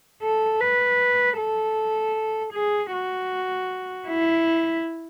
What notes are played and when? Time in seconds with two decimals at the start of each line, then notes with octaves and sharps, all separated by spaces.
0.22 A4
0.60 B4
1.38 A4
2.54 G#4
2.92 F#4
4.08 E4